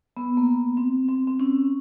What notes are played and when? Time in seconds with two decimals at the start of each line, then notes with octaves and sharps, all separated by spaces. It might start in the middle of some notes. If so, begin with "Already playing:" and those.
0.17 B3
0.37 A#3
0.47 B3
0.77 C4
1.08 C4
1.27 C4
1.40 C#4